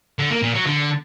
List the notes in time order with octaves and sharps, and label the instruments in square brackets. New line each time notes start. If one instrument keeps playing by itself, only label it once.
[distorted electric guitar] D3
A#3
A#2
F#3
D3